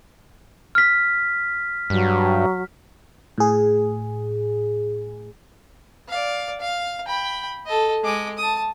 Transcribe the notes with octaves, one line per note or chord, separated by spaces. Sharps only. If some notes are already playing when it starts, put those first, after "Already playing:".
F6 B6
G2 F#3
A2 G#4
D5 F5
F5
G5 B5
A4 D#5
G#3 D6
A5 D#6